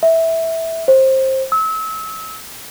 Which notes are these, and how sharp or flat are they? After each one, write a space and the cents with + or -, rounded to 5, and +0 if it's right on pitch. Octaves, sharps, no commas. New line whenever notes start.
E5 -10
C5 +20
E6 -30